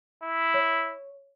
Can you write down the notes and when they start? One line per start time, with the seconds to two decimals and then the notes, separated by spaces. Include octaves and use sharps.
0.23 E4
0.54 C#5